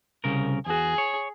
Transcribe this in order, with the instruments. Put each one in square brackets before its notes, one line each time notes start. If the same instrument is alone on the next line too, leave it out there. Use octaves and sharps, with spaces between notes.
[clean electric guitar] C2 C#3 A#4
[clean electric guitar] E2 F#4 [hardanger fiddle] G#4
[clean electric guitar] C#5